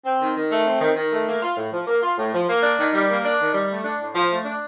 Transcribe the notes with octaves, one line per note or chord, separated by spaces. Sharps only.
C4
D#3
D#3
A3
C4
D#3
D#3
A3
A#3
F4
A2
F3
A#3
F4
A2
F3
A#3
D4
D#3
G3
A#3
D4
D#3
G3
A3
D4
A2
F3
A3
D4